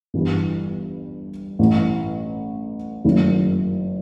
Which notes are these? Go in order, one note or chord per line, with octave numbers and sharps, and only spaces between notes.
G1 G2 E3 G3
A1 A2 E3
F#1 F#2 D#3 A3 E4